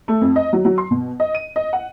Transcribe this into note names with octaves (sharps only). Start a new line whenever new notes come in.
A3
F2
D#5
F#3
F#3
C6
B2
D#5
D#7
D#5
F#5